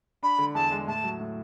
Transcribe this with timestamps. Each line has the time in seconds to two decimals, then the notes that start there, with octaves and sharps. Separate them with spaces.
0.23 D4 B5
0.39 D3
0.54 E2 A5
0.71 G#3
0.87 A2 A5
1.04 F#3
1.20 A2